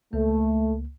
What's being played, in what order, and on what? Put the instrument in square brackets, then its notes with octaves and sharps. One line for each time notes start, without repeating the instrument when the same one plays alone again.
[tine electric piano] C#2 A#3 [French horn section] A3